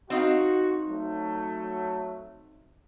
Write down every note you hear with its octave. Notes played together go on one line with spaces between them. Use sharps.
C4 D#4 F#4 F5
F#3 A3